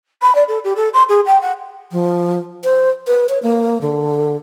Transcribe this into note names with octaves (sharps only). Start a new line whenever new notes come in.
B5
D5
A4
G4
A4
C6
G#4
G5
F#5
F3
C5
B4
C#5
A#3
D3